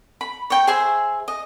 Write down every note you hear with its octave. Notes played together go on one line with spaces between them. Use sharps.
B5
C#5 G5
G#4 C5 E5 G#5
D#5